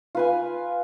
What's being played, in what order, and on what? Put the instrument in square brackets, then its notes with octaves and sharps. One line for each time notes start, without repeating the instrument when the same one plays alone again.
[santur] F4 B4 G#5